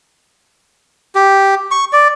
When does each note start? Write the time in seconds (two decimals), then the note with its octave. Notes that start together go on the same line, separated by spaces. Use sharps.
1.15 G4
1.71 C#6
1.93 D5